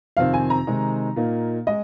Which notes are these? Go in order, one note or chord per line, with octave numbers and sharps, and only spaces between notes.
F2 C3 D#3 C4 F5
G#5
A#5
C3 D#3 G#3 D#4
A#2 A#3 D#4
G#3 D#5